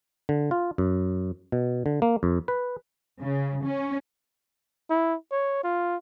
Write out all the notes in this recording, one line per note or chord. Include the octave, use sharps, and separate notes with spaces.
D3
F4
F#2
B2
D3
A#3
F2
B4
C#3
C#4
E4
C#5
F4